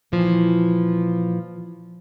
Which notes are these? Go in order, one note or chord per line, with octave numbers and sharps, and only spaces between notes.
A#2 E3 F3